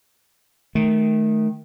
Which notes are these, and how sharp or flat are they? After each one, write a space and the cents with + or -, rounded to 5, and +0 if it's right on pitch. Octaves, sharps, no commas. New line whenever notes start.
D#3 +0 A3 -25